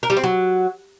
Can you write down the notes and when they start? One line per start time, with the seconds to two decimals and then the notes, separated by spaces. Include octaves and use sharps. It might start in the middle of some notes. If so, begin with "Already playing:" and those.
0.03 A#4
0.10 G3
0.17 C4
0.24 F#3